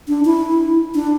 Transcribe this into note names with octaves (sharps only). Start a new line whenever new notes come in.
D4
E4
D4